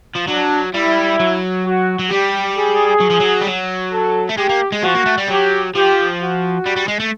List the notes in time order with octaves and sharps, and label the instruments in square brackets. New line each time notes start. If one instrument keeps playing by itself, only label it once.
[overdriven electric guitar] F3
[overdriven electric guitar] F#3 [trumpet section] D4
[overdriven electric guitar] G3 [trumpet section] E4
[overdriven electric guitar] F#3
[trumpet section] F#4
[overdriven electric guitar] F#3
[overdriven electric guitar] G3 [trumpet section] G4
[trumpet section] G#4
[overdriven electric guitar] F#3
F3
F#3
G3
F#3
[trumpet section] A4
[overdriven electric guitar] A3
[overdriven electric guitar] G#3 [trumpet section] G4
[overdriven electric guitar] A#3
G#3
[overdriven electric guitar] F3 [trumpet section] F#4
[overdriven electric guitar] A#3
A3
G3
[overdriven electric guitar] F#3 [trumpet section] G4
[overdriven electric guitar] F3 [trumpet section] G4
[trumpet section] F#4
[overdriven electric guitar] G3
G3
G#3
A3